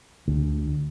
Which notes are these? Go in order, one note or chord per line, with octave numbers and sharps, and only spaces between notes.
D2